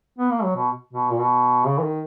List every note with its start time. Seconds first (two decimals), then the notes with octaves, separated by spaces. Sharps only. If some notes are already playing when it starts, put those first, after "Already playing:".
0.18 B3
0.31 A#3
0.44 F#3
0.56 B2
0.93 B2
1.10 A#2
1.18 B2
1.67 C#3
1.79 E3
1.83 D#3